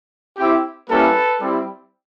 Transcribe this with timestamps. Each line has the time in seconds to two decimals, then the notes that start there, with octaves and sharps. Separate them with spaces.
0.37 C4 E4 G4
0.88 G3 A#3 C#4 E4 G4 A4 B4
1.39 G3 C4 E4 G4